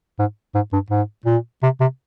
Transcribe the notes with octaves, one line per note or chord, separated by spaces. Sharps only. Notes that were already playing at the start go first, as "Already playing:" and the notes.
G#2
G#2
G2
G#2
A#2
C3
C3